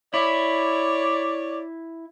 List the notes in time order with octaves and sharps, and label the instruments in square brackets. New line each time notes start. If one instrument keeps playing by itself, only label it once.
[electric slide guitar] E4 [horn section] C#5 D5